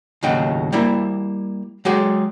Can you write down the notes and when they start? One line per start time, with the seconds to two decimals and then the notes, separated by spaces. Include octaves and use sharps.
0.23 D#2 A2 C#3 F#3 D#5 G5
0.72 G3 A#3 E4
1.85 F#3 G#3 G4 G#4